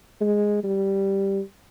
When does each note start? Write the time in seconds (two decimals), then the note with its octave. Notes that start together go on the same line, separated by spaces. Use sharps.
0.21 G#3
0.63 G3